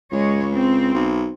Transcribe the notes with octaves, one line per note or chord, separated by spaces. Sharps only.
C#2 G#3 C#5
C4
B1